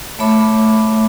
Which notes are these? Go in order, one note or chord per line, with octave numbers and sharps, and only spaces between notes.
A3 C#5 E5 B5 D6